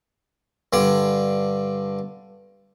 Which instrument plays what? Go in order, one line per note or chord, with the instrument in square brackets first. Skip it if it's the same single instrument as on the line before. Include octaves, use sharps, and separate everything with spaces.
[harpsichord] G2 D3 D5